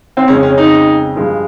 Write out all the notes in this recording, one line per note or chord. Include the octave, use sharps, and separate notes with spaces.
C4
F2 C#3 G#3 C#4
C#4
D#4
G2 F3 G#3